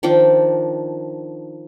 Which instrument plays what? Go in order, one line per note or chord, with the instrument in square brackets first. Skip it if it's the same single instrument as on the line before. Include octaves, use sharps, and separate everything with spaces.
[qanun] D#3 F3 D4 G5